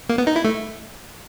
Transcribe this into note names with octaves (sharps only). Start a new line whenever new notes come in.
A#3
B3
D#4
E4
A3